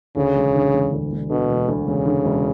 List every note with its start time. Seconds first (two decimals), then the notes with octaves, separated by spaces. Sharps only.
0.16 D2 C#3
0.35 E1
0.54 D3
0.73 E1
0.92 D2
1.11 E1
1.30 B2 D3
1.49 E1
1.68 D2
1.87 E1 C#3
2.06 D3
2.25 E1